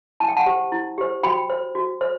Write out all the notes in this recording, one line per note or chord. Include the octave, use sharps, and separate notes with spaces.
E4 A5
G5
F#5 A5
G4 C5
E4
G4 C5
F#4 G5 B5
C5
F#4
C5